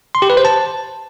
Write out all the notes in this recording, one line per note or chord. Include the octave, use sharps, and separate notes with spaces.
C6
G4
B4
C5
A5